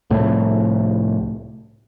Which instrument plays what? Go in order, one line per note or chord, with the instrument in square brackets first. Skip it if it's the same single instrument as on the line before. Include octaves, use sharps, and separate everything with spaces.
[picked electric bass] C2 A2